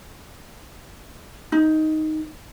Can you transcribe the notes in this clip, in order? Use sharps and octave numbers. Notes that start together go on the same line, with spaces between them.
D#4